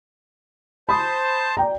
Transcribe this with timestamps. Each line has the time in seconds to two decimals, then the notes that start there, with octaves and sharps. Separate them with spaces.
0.89 C5 A5 B5 D#6
1.57 D5 G5 A#5